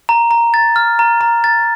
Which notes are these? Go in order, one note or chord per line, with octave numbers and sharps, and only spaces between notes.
A#5
A#5
A6
F6
A#5
A#5
A6